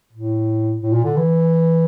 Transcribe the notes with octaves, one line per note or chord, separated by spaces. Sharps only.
A2
A2
A#2
D3
E3